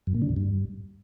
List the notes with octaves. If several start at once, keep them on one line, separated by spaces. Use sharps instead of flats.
F#2
A#2
D3
E2
G2